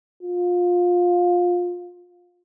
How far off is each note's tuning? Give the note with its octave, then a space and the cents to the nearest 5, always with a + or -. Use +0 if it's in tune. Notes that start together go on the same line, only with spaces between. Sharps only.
F4 +20